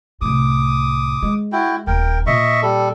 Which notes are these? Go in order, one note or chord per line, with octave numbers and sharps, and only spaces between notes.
C2 A2 D6 D#6
G#3
E4 F#4 G5
D#1 A#4 G5
A#2 D#5 E5 C#6
G3 A4